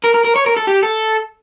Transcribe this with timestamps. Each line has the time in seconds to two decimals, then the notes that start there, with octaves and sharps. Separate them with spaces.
0.04 A#4
0.15 A#4
0.25 A#4
0.36 C#5
0.46 A#4
0.56 A4
0.67 G4
0.83 A4